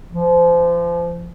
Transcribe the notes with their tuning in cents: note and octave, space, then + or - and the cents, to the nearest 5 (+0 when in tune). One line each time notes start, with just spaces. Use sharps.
F3 -30